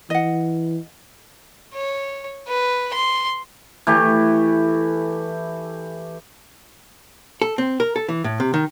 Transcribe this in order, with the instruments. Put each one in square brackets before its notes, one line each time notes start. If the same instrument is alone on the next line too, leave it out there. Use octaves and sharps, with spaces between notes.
[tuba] E3 [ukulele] D#5 F#5
[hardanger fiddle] C#5
B4
C6
[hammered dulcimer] E3 A3 G4
[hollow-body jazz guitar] A4
C4
A#4
A4
E3
A2
C3
D#3